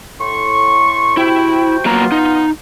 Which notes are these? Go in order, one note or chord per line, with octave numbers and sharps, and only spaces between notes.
A2 C6 C#6
C3 E4 F#4 G5
F#3 A#3 B3 F4 A#5
D#4